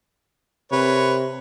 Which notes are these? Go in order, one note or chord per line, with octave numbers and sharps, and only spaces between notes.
C3 A#4 B4 C#5